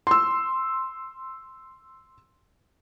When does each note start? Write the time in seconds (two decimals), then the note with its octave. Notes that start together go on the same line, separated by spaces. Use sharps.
0.07 C6 E6